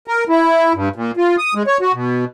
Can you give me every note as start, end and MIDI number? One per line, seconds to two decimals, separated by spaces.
0.08 0.24 70
0.29 0.73 64
0.74 0.89 43
0.96 1.11 46
1.17 1.36 65
1.38 1.54 87
1.55 1.63 56
1.67 1.78 73
1.81 1.92 66
1.93 2.25 47